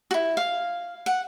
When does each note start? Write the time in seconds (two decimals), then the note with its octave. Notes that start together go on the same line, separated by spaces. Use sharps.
0.11 E4 F#4
0.37 F5
1.06 F#5